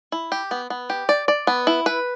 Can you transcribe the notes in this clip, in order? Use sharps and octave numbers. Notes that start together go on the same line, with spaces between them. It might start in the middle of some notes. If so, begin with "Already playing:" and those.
E4
G4
B3
B3
G4
D5
D5
B3
E4
B4